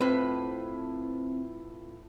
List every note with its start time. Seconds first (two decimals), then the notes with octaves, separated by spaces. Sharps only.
0.01 A2 C4 E4 F4 B4